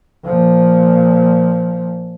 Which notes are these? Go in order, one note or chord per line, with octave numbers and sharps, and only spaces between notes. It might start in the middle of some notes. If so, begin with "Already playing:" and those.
A#2 F3